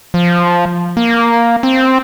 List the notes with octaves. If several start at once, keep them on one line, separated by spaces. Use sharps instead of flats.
F3
A#3
C4